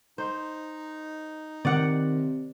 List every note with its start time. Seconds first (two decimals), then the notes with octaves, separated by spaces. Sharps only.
0.18 D#4 C5
1.65 C3 D#3 D5 F#5